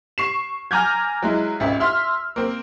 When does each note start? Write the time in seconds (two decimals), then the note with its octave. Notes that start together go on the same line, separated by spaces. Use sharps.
0.18 C#6 C7 E7
0.71 G#5 A#5 D6 F6 G6 G#6
1.22 F#3 G#3 E4
1.60 G#1 C#2 E5
1.80 E5 C6 E6 F6
2.36 A#3 C4